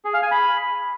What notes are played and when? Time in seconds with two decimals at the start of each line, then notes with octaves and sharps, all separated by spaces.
0.05 G#4
0.14 F5
0.23 G#5
0.32 B5